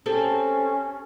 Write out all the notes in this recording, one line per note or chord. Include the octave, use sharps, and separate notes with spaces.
C4 C#4 G4 A4